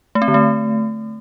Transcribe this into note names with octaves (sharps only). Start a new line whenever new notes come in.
A3
C4
D3
A3